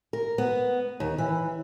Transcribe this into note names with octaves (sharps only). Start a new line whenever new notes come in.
A#4
B3
D#2
E3